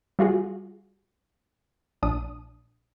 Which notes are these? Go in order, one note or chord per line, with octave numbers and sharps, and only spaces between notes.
G3 F4 F#4 G#4
A#1 D4 D#6